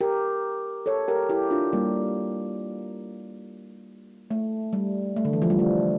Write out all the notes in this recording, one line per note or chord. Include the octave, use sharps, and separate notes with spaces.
G4 A#4
A4 C#5
G4 A#4
E4 G4
D4 F4
G3 A#3
A3
G3
A3
D3
E3
F3
G3
A3